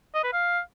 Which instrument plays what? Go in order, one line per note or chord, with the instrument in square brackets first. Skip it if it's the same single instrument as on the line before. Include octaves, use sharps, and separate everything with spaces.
[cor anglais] D#5
B4
F5